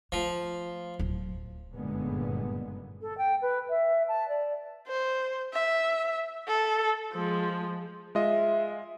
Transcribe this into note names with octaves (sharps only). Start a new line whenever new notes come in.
F3 A3
D1
F#1 G2 A#2 D3 G#3 B3
A4
G5
B4
E5
A5
D5
C5
E5
A4
F3 G#3
G#3 F4 D#5 E5